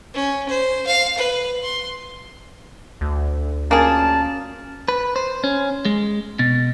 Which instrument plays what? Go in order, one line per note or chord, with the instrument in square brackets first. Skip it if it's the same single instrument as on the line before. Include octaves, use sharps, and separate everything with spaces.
[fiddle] C#4
C5
F5
B4
C6
[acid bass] D2
[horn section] A#2 A5 [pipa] A#3 G#4 [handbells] C#4 F6
[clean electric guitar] B4
C5
C#4
G#3
B2